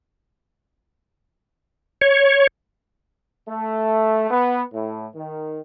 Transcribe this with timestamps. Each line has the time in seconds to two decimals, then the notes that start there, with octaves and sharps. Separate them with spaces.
2.01 C#5
3.49 A3
4.31 B3
4.74 A2
5.15 D#3